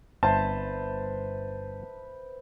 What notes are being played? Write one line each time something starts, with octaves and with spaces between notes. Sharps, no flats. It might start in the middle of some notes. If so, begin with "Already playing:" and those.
G1 B4 C5 E5 A5